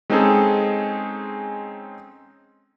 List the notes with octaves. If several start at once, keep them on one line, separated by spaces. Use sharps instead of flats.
G#3 C4 C#4 D#4 G#4 A4